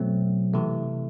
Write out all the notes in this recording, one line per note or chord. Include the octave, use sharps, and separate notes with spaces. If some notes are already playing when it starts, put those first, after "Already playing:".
Already playing: B2 F#3 A3 C4
C3 E3 A3